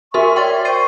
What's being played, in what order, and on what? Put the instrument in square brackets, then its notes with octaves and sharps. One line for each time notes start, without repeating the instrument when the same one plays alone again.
[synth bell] F#4 A#4 C6 [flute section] E5 C#6
[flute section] C#5 D5 E5 [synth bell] G5 C6 A6
[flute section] C5 G5 C#6 [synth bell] A6 C7 D#7